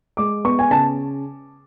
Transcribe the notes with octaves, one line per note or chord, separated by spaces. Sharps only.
G#3 D6
B3 C#6
G#5
C#3 A5